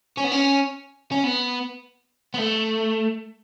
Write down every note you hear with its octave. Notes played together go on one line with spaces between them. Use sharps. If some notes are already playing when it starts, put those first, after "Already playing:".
C#4
B3
C#4
C#4
B3
B3
A3